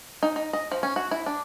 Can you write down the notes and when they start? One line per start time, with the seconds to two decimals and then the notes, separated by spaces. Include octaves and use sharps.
0.23 D#4
0.36 D#4
0.53 D#5
0.72 F3
0.83 C#4
0.96 F#4
1.11 E4
1.26 D4